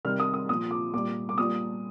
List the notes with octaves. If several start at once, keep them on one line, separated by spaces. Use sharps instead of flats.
C3 D#3 G3 F6
D#6
D#6
A#2 F3 D#6
D6
A#2 G3 D6
D6
A#2 G3 D#6